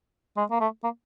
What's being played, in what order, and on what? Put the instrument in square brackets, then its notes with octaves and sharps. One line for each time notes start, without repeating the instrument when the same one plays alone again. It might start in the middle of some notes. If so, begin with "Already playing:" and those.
[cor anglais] G#3
A#3
A3
A#3